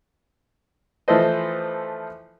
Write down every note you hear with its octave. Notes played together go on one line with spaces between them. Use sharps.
E3 F3 A3 A4 C5 D#5